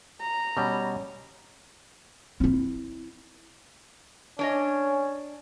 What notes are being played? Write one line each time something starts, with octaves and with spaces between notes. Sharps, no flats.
A#5
B2 G3 C#4
C4 E4
C#4 D4 C#5 D#5